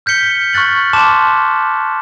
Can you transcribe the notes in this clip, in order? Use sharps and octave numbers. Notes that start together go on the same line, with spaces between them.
F6 G6 B6 C#7 G7
C#6 F6 F#6 A6 F#7
A5 C6 D6 E7